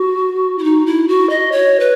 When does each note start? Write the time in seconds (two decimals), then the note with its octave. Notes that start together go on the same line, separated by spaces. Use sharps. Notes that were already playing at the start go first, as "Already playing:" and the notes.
Already playing: F#4
0.58 E4
0.64 D#4
0.86 E4
1.08 F#4
1.30 D#5
1.52 C#5
1.80 B4